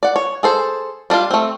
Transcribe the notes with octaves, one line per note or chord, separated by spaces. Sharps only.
D5 F#5
C#5
G#4 A4 C5
G3 D4 D#4 F4
A3 C4